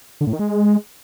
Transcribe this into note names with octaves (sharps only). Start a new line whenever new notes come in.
D3
A2
D#3
G#3